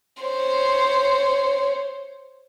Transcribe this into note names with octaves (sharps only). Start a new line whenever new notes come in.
C5 C#5